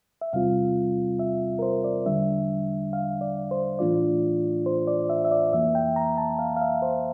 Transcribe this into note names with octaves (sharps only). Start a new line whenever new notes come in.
E5
E2 C3 G3 C4 F4 F5
E5
A#4
C5
D5
E2 D3 G3 D4 E5
F5
D5
C5
A2 E3 A3 D4 F4 D5
C5
D5
E5
E5
D5
F2 E3 A#3 E5
G5
A#5
A5
F5
F5
E5
C5